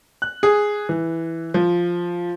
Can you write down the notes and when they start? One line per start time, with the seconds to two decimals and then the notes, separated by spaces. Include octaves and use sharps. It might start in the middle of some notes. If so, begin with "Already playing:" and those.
0.22 F#6
0.43 G#4
0.89 E3
1.54 F3